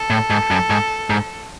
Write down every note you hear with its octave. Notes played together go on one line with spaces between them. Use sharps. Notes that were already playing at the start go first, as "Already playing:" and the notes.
Already playing: A4
A2
G#2
F#2
G#2
G#2